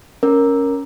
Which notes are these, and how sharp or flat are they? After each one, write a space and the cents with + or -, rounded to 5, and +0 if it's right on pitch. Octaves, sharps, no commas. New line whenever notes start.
C#4 +0 A#4 +0